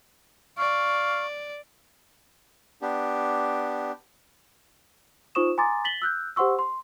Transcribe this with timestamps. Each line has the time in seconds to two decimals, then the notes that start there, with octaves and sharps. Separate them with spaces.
0.58 D5 F5 C#6
2.82 B3 D4 G4
5.35 D#4 F4 C5 C#6 D#6 E7
5.58 G#5 A#5 C6 D6 D#6 A6
5.84 A6 B6 F#7 G7
6.02 E6 F#6 G6
6.36 G4 C5 F#5 C6 C#6 E6
6.59 C6